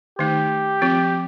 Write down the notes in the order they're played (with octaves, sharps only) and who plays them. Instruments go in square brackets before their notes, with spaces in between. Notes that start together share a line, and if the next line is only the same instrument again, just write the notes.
[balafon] D#3 A3 D#4 [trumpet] G4
[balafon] F3 C4 F4